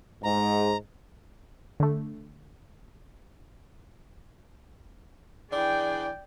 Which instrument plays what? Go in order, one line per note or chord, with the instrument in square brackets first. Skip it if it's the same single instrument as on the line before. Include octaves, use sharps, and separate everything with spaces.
[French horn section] G#2 [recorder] A#5
[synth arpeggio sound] D3 A3
[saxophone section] E3 D4 G#4 [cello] D5 G5